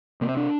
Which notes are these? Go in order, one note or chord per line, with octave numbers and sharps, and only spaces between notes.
C3 A#3
C4
D4